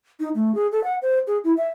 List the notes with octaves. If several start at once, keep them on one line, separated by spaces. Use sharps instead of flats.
D#4
A3
G#4
A4
F#5
C5
G#4
E4
E5